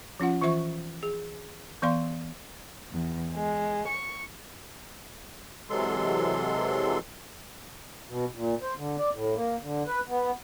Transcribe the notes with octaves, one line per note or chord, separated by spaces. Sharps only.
F3 C#4 F4 F#5
E3 F4 C5 E5 C#6
G#4
E3 B3 D5 F5 C6
E2
G#3
C#6
C3 E3 F#3 G#3 A4 C6
B2
A#2
C5
D3
D5
A2
A#3
D3
B4
B3